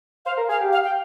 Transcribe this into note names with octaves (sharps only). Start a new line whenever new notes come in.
C5 F5
A#4
G#4 F5
G4
F5
G5